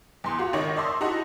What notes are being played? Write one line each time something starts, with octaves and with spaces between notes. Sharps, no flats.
E2 C6
F4 F#4 F#5
G#1 D#3 D#4 C#5 A#6
D5 E5 A5 C6 C#6 D#6
D#4 E4 F#4 D#5 F#5 A5